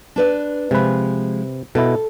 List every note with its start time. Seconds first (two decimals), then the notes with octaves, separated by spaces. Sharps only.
0.16 D4 B4 D5
0.71 C3 F3 G#3 B4
1.75 B2 E4 A4